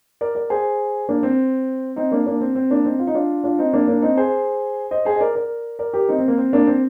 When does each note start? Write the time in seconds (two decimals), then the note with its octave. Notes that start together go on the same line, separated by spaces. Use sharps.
0.21 A#4 D5
0.35 A#4 D5
0.50 G#4 C5
1.09 A#3 D4
1.23 C4
1.96 C4 D#4
2.12 A#3 D4
2.26 A#3 D4
2.41 C4
2.55 C4
2.70 A#3 D4
2.85 C4 D#4
2.99 F4
3.07 D#4
3.14 D4 F4
3.44 D4 F4
3.59 C4 D#4
3.73 A#3 D4
3.88 A#3 D4
4.02 C4 D#4
4.17 G#4 C5
4.91 C5 D#5
5.05 G#4 C5
5.16 D#5
5.21 A#4 D5
5.35 A#4 D5
5.79 A#4 D5
5.93 G4 A#4
6.09 C4 D#4
6.19 C4
6.28 A#3
6.38 C4
6.53 A#3 D4
6.67 C4